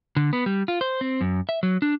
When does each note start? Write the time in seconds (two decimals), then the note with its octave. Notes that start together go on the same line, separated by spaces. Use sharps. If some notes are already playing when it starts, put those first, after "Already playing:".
0.16 D3
0.33 B3
0.46 G3
0.68 F4
0.81 C5
1.01 C4
1.21 F#2
1.49 E5
1.63 F#3
1.82 D4